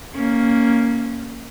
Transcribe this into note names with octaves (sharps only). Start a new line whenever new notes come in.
A#3 C#4